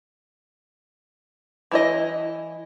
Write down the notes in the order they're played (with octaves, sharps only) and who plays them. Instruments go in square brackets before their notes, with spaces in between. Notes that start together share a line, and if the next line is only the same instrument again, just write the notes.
[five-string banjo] E3 E4 D#5